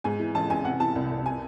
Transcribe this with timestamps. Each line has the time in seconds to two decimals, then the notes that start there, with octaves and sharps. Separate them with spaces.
0.04 G#2 G#5
0.20 E3
0.35 A1 A5
0.50 A1 G#5
0.65 C3 F#5
0.80 E3 A5
0.96 C2
1.11 C2
1.26 G#5